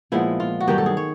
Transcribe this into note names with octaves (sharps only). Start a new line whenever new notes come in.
A#2 F3 G#3 B3 E4
F4
F#4
G2 D#3 F#3 G4
A4
G#4
C#5